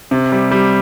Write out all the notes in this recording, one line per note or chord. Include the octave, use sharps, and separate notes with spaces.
C3
G3
G3